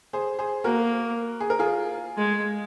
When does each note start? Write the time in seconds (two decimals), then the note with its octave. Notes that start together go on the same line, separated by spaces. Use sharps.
0.13 G#4 C5
0.39 G#4 C5
0.64 A#3 F#4 A#4
1.40 G#4
1.50 A#4
1.59 F4 G#4
2.17 G#3